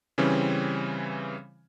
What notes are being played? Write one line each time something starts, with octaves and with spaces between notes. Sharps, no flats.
C#3 E3 G3 C4 C#4